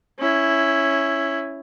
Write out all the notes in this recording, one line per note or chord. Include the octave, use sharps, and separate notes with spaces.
C#4 E4